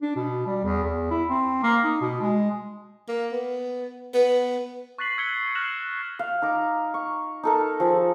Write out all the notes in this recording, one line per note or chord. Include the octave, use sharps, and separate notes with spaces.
D4
B2
G3
E2
E2
E4
C4
A#3
D#4
B2
G#3
A#3
B3
B3
C#6 F#6 A6 B6 C7 F#7
E6 G#6 B6 C#7 F#7 G7
F6 F#6 A#6 C7 E7 F#7
F5
D#4 A#5 D6
C#6
D#4 A4 A#4
F3 G#4 A4